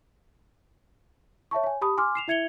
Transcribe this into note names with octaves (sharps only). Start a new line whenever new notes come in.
C#5 E5 A5 C#6
C#5 G#5
G4 A5 B5 D#6
G#5 C6 D6 F6
C7 E7 F7
E4 E5 G#6 C#7 F7 G7